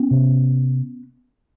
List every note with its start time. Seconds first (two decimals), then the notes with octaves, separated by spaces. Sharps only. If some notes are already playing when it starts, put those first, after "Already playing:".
Already playing: B3 C#4
0.11 C3